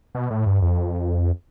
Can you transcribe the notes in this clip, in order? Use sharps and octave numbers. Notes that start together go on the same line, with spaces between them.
B2
A2
G2
F2